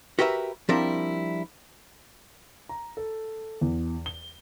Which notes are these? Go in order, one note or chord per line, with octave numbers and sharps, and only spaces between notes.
F#4 G4 A#4 B4 D#5 E5
F3 G3 C4 D4 E4 A#4
A#5
A4
E2
G7